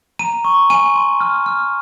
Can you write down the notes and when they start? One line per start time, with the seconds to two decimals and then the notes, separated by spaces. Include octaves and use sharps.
0.19 A#5 D#7
0.45 C#6
0.70 G#5 D#7
0.96 C6
1.20 F6
1.46 F6